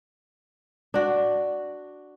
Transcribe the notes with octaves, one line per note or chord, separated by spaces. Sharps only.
D4 F#4